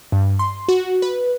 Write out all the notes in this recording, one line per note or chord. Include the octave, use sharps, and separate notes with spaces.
G2
C6
F#4
B4